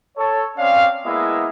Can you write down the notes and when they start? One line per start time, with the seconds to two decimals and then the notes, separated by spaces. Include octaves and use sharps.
0.17 A4 C#5
0.57 C4 C#4 C#5 D5 F5
1.05 G#3 A#3 B3 E4 D#5 E5